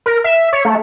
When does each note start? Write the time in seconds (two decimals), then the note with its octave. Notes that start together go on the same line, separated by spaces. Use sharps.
0.06 A#4
0.24 E5
0.53 C#5
0.65 A3